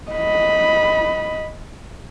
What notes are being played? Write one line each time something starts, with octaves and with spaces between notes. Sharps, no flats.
D#5 B5